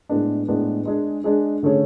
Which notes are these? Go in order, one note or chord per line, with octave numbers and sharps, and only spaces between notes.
A2 G#3 B3 D4
A2 G#3 B3 D4
G#3 D4 G#4
G#3 D4 G#4
D3 A3 C#4 G#4 C#5